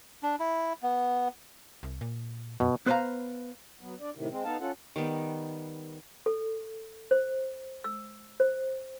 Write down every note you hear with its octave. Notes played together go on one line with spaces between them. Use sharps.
D4
E4
B3
C2
A#2
F#2 B2
B3 B4 C5 D#5 F5 A#5
F#3 B3
D4 D5
A2 C3 D#3
G#3 C4
B3 D#4 A4 F5 A5
C#4 F4 A4 F#5
D#3 G3 B3
A4
C5
E6
C5